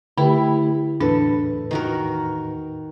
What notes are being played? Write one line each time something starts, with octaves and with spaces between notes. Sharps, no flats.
D3 A3 E4 G4 G5
E2 A2 D4 A4 B4
D#3 F#4 A#4